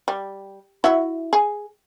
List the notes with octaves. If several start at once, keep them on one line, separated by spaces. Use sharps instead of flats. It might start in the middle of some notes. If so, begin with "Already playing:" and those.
G3
E4 F#4 E5
G#4